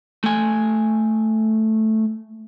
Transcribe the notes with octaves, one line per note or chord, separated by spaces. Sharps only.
A3 G#5